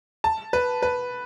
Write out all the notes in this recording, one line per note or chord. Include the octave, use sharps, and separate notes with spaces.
A5
B4
B4